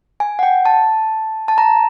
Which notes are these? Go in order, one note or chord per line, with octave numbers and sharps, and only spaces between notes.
G#5
F#5
G5
A5
A5
A#5